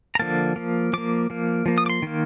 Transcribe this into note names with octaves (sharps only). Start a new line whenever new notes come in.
A#5
D3 F3 A#3 A5
F3 A#3
F3 A#3 D6
F3 A#3
F3 A#3
D#6
D6
C6
D#3 A#3